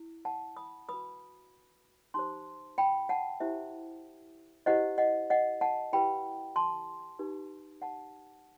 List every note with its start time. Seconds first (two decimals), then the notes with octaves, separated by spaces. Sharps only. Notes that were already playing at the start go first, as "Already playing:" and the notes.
Already playing: E4
0.25 F#5 A5
0.57 B5 D#6
0.89 F#4 B4 B5 D#6
2.14 D#4 G4 C5 A5 C6
2.78 G5 B5
3.09 F#5 A5
3.40 E4 G4 C5 E5
4.66 E4 G4 C5 D#5 F#5
4.98 D#5 F#5
5.30 D#5 F#5
5.61 F#5 A5
5.93 E4 G4 B4 G5 B5
6.56 A5 C6
7.19 D#4 G4 B4
7.82 F#5 A5